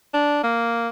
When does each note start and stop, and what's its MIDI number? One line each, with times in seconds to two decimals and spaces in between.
0.14 0.40 62
0.43 0.89 58